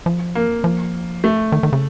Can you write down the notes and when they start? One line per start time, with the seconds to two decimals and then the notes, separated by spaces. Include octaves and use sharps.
0.06 F3
0.35 A#3
0.64 F3
1.24 A3
1.52 D#3
1.63 D#3
1.73 C#3